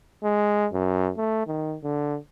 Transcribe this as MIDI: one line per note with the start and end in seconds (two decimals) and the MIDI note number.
0.23 0.66 56
0.73 1.11 42
1.17 1.47 57
1.47 1.75 51
1.84 2.17 50